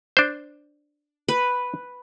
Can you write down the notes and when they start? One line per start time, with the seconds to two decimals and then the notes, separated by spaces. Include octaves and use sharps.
0.17 D4 C5
1.28 B4